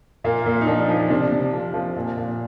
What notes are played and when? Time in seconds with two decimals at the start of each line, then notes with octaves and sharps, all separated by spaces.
0.24 A#2 A#3
0.46 A#2
0.61 D#4
0.67 F3 D4
0.89 F3
1.10 C3 D4
1.31 C3
1.53 F3
1.74 F3
1.96 A#2
2.17 A#2